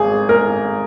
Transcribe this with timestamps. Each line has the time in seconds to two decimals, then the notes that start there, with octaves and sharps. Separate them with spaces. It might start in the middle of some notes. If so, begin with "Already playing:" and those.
Already playing: G#1 G#4
0.29 A#4